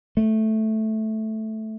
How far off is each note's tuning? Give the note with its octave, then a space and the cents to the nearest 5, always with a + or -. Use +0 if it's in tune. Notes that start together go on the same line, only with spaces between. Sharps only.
A3 -5